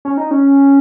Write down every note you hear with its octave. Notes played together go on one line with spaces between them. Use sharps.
C#4
D#4
C#4